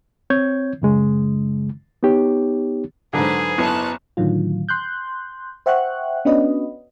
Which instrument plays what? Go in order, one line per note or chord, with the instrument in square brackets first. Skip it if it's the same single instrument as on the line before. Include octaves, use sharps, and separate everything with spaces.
[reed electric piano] C4 C#5 G6 G#6
F#2 C#3 G#3
B3 D#4 G4 C#5
[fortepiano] G#2 D3 [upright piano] F#3 [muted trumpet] G#4 [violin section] B4 C5
[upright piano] F#1 B3 E4 [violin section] C#5 A5 F#6
[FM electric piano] A2 D3 D#3 F#3 F4
C6 F#6 G6
C5 E5 F#5 G5 C#6 F#6
B3 C#4 D4 F#4 B4 D#5